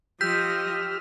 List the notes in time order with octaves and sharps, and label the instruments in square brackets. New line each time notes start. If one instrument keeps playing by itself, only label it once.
[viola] F3 D#5 [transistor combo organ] G4 E6 F6 [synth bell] G6 B6